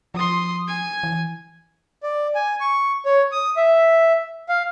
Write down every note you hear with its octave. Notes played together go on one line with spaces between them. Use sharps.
F3 C6 D#6
G#5
E3
D5
G#5
C#6
C#5
D#6
E5
F5